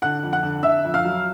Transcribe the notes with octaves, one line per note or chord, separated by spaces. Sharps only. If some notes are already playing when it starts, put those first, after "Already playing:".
D3 F#5 F#6
F2
F#5 F#6
D3
D3 E5 E6
F2
F5 F6
F#3